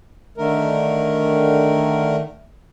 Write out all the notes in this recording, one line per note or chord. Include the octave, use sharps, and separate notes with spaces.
D3 D#3 A3 A#4